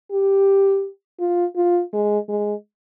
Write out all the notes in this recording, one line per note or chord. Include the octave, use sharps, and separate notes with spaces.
G4
F4
F4
G#3
G#3